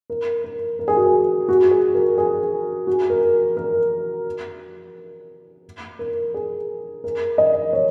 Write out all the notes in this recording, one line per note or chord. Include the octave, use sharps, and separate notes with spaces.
A#4
A#4
A#4
G#4
F#4
G#4
F#4
G#4
A#4
G#4
F#4
A#4
A#4
A#4
G#4
A#4
D#5
C#5